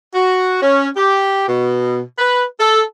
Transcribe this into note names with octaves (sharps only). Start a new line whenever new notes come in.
F#4
C#4
G4
B2
B4
A4